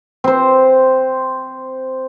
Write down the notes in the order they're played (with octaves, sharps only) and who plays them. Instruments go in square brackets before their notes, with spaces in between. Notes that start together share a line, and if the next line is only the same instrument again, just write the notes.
[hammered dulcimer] C4 C5